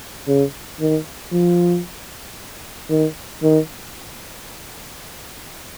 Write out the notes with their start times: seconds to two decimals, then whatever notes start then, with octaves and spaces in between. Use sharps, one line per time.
0.28 C#3
0.80 D#3
1.33 F3
2.90 D#3
3.43 D#3